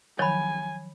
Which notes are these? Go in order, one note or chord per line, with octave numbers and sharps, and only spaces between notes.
D#3 F3 F#3 C#5 G#5 B5